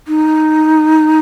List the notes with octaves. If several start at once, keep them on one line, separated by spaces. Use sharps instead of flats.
D#4